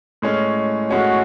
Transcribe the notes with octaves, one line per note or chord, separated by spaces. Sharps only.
A2 G#3 C#4
A2 G#3 C#4 F#4